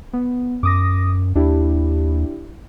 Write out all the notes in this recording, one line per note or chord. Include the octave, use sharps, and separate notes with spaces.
B3
F#2 D6 D#6 A#6
D#2 D4 E4 G4